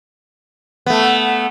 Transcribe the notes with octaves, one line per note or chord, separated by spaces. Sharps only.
A3 B3